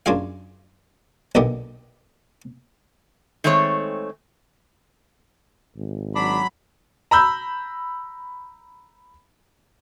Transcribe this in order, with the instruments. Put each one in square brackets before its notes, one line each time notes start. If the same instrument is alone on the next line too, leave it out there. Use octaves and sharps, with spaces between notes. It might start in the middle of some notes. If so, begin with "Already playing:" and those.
[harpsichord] F#2 D4 F4 G#4 F5
B1 A#2 D3 B3 G4 D#5
[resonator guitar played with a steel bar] D#3 G#3 A3 C4 C#5
[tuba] G#1
[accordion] F#3 B5 [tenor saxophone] D4
[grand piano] A#5 B5 E6 G6